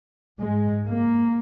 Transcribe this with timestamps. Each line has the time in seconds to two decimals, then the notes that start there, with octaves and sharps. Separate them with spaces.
0.40 G#2 G#3
0.85 A#3